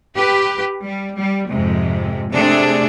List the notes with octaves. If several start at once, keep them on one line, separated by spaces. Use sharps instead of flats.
G4 B4
G3
G3
F2 G#2 C3 G#3
C3 A3 C4 D4 G#4